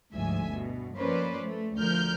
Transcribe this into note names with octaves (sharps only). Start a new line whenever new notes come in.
G1 D2 G#2 F3 E5 G#5
G2 B2
F3 A#3 C#4 B4 C5 D5
A3
D2 F3 A#4 F6 G6